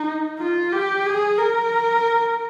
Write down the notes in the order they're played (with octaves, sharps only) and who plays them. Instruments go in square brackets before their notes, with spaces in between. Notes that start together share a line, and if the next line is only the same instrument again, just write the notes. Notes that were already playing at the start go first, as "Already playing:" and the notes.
Already playing: [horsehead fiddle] D#4
F4
G4
G#4
A#4